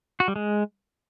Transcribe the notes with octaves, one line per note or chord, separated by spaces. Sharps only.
F#4
G3
G#3